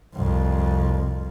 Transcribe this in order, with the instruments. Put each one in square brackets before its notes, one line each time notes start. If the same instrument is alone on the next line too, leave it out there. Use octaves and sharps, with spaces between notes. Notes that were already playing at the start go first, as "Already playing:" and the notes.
[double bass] C2 F2